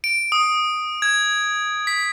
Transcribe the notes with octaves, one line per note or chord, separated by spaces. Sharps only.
D7
D#6
G#6
B6